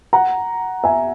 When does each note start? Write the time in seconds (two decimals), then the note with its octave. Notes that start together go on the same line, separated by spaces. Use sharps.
0.13 F#5 A#5
0.84 E5 G#5